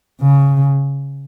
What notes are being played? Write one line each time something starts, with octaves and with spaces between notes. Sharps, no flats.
C#3